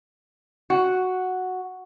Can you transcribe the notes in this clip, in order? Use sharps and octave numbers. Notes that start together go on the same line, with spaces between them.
F#4